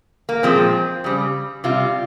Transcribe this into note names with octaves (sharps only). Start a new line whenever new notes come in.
A#3
A#2 F3 G#3 C4
C#3 G3
C3 G3 F4